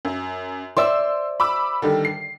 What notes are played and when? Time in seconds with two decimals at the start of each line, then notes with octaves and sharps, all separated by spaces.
0.05 F#2
0.77 C5 D5 E5 C6 E6
1.40 B5 D6 E6
1.82 D3 D#3 G3
2.05 C7